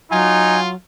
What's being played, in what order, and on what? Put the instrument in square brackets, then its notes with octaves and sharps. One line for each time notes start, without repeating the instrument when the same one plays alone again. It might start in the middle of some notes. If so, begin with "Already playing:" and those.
[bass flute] F#3 [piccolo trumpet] D#4 [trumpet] F4 [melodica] G#5